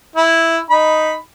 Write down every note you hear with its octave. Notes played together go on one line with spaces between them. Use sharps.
E4
D#4 B5